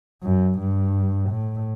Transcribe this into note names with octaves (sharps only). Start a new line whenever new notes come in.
F#2
G2
A2